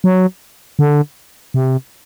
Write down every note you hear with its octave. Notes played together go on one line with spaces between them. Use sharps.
F#3
D3
C3